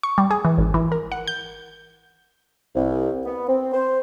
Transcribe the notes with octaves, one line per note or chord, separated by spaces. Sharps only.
C#6
G3
G#4
E3
G#1
E3
A#4
F#5
G6
C2
B3
C4
C5